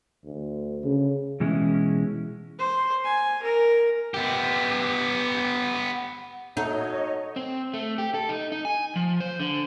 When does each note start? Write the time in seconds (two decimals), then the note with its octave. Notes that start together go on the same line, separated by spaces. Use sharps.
0.25 D2
0.83 C#3
1.40 B2 E3 G#3 C#4 E4
2.59 C5
3.04 G#5
3.42 A#4
4.14 B3 G4
6.57 F#3 D#4 A4 C#5 D#5
7.36 C4
7.74 A3
7.98 G4
8.14 A4
8.29 D#4
8.52 D#4
8.65 G#5
8.96 F3
9.20 C5
9.40 D3